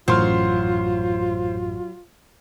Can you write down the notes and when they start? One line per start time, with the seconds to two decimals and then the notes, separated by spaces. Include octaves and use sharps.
0.08 A1 F#2 A2 F#3 F4 C5 C6 F6